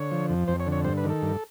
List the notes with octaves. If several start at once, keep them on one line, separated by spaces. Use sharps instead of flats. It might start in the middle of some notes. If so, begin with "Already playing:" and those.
Already playing: D3 C#5
F3
F2
F2 C5
C#5
D3
C#5
G2 C5
B4
D#3
A4
G2